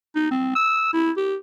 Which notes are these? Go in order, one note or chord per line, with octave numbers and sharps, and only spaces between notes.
D#4
C4
E6
E4
G4